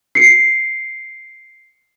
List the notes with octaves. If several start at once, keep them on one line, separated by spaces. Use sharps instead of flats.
C7 C#7